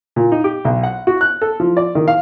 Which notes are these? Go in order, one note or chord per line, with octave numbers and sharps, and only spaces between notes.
A#2
D#4
G4
B1
F#5
F#4
F#6
A4
F3
D5
D#3
F5